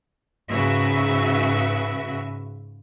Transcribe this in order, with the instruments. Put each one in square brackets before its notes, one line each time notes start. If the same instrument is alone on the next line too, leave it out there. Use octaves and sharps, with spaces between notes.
[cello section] G#2 C#3 F#4 B4 E5